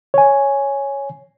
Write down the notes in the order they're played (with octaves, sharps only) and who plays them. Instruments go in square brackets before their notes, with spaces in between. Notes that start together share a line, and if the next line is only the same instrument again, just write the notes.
[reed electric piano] C#5 G#5